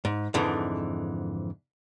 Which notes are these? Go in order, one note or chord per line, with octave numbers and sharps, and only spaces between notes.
G#2
F2 G#2 D3 E3